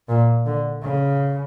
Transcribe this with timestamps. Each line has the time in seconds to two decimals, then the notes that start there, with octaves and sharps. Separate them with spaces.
0.09 A#2
0.46 D3
0.83 C#3